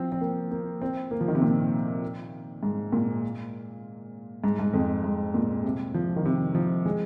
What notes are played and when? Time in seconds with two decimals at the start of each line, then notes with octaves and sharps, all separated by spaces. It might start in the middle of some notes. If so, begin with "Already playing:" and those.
Already playing: F3 C4
0.12 C4
0.21 A#3
0.51 A#3
0.81 C4
1.11 A#3
1.21 F3
1.28 D#3
1.35 C3
1.42 A#2
2.63 G#2
2.92 A#2
4.44 G#2
4.59 G#2
4.73 F2
5.04 G#2
5.34 A#2
5.64 C3
5.94 F3
6.16 D#3
6.25 C3
6.55 F3
6.86 G#3